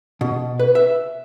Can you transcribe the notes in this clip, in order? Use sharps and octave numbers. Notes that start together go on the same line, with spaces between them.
B2
B4
E5